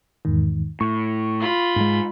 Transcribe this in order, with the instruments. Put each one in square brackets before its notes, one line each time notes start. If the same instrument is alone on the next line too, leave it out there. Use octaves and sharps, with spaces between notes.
[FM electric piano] E2 G#2 D#3
[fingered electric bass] A2 [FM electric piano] C#6
[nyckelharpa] F4 B5
[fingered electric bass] G#2 G#3